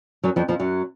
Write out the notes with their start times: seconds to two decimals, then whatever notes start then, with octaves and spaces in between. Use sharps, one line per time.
0.23 F#2 F#3
0.36 F2 F3
0.48 F2 F3
0.60 F#2 F#3